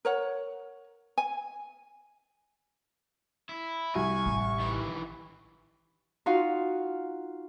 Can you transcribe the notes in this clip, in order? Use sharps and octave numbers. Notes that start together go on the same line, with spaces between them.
A#4 C#5 F#5
G#5
E4
C2 G#5 C#6
A1
D#3 E3
D#4 F4 F#4 F5